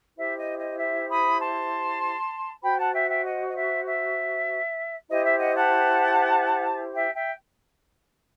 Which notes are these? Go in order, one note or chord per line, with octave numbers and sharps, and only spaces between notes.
E4 G4 C5 E5
D#5
D#5
E5
B5 D#6
A5 C6
F#4 C5 G5 B5
F#5 A5
E5 G5
E5 G5
D#5 F#5
D#5
E5
E5
E4 G4 C5 D#5
E5
D#5 F#5
F#5 A5
E5 G5
E5 G5